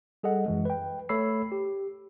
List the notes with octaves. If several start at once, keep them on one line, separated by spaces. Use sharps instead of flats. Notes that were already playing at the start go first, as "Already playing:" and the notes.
G3 G#4 A4 D#5 F#5
F#2 E3 G#3
B4 G5
A3 A4 C#5 B5 E6 C7
G4